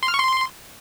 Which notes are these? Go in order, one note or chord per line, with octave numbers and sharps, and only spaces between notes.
C6
F6
C#6
C6